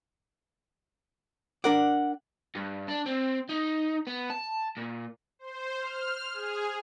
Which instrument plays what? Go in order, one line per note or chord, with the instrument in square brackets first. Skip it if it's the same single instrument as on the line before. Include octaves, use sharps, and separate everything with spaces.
[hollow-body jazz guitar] D4 A#4 D5 [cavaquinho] F#5
[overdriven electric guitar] G2
D4
C4
D#4
B3
A5
A#2
[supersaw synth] C5
F6
G#4